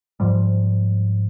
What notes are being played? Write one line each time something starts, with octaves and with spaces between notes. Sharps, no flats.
G#2 F3 G3